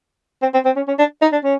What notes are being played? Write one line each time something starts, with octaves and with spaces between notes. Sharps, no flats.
C4
C4
C4
C#4
C#4
D4
D#4
D4
C#4